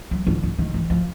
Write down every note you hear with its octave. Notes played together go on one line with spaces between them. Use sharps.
F#3
D3
D3
D#3
E3
F3